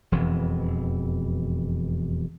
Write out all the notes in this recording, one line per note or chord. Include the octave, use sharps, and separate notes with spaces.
E1 F2 E3